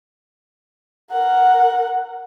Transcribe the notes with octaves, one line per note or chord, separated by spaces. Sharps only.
A#4 F#5